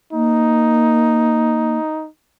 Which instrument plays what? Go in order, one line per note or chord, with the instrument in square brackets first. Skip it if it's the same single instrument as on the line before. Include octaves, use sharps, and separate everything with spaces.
[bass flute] A#3 [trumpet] D#4